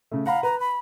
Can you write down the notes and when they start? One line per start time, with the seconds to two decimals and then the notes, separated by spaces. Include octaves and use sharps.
0.11 C#3 A3
0.26 F5 F#5 A#5 B5
0.43 B4 A#5
0.60 B5